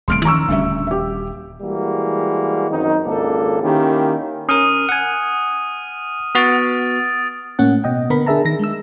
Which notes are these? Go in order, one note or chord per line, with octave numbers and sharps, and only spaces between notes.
D#1 C2 A3 C6 F6 D7
D#3 F3 C#4 A#5 C#6 E6
D#1 D2 G3 C#4 E5
G4 E5
E3 G3 G#3 A#3 F#4
F#2 D#3 C4 D#4
G#1 C#2 A#3 D4 A4
D#3 A#3 C#4 E4 G4
C#4 A#4 D#6 F6 D#7
F#5 G#5
B3 F#4 D#6 A6 D7
A2 A#3 C#4 F#5
B2 D#5 G5
D3 B3 A#4 B5
D4 G#4 A#4 E5 A5 A#5
D#3 A#6
G#3 E6